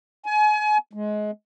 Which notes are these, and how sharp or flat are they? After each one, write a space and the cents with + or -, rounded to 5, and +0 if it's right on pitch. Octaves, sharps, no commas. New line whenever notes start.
G#5 +35
G#3 +25